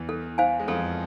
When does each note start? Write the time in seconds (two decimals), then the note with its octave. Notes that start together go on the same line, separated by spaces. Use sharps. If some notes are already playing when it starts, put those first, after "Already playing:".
Already playing: E2 E3
0.09 A4
0.38 C5 F5 G#5
0.59 G#3
0.68 F2 F3 A4